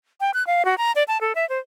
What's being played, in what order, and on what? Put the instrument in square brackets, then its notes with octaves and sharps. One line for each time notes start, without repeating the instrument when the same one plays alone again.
[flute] G5
F#6
F5
F#4
A#5
D5
A5
A4
E5
C5